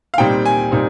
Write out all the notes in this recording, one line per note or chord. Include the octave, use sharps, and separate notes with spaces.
F5
A#2 G3 C4 D#4 G5
G#5
A#2 G3 C4 D#4